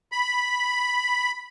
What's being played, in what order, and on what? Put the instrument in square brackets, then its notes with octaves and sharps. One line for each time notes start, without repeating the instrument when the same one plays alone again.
[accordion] B5